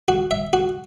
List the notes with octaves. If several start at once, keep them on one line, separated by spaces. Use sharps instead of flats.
F#4
E5
F#4